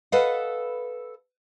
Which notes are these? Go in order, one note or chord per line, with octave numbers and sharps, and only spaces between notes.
A4 B4 D#5 F5 F#5